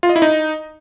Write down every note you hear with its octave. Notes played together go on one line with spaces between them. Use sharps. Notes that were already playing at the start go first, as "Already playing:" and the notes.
F4
D#5
E4
D#4